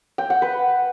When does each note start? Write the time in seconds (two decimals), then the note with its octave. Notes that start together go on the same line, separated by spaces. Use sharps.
0.18 G5
0.30 F#5
0.42 B4